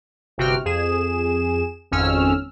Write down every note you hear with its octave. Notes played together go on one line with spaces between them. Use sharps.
G1 C3 F#4 G5 F6
F2 G#4 E7
G#1 F2 C#4 E6 F6